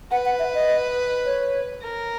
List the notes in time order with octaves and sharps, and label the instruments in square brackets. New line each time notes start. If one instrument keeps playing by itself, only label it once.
[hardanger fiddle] B4 [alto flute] F#5
[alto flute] F#5
E5
D#5
C#5
[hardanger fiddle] A#4